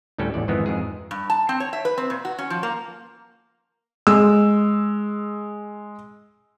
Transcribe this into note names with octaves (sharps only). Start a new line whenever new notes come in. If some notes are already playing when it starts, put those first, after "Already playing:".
D2 A2 G3 C#4 A4
A1 E2 D5
F2 G#2 D#3 E3 G#3 B3
F2 G#2 G#4
G2
A5
C4
C#5
E5
B4
C4
A#2
F#4
C#4
F3
A#3
G#3 E6